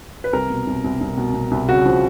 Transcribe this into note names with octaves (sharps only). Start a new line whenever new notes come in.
B4
C2 A#4
B2
C2
C2
C2
B2
B2
C2
C#3 F#4
F3